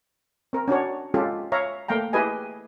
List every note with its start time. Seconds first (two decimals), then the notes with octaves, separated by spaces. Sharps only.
0.53 C4 A#4
0.68 C#4 D4 F#4 C#5
1.14 G#3 C#4 F4 G4 A4
1.52 C#5 E5 F5 A#5
1.88 A3 A#3 F5 G5 A#5
2.13 E4 G4 G#4 B4 D#5 G#5